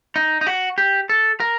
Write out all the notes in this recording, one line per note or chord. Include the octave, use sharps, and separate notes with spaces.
D#4
D#4
F#4
G4
A4
A#4